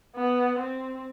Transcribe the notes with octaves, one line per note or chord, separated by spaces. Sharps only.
B3
C4